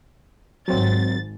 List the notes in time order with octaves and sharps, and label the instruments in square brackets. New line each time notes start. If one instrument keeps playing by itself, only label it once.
[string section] G#1 A6 [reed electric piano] F#3 C4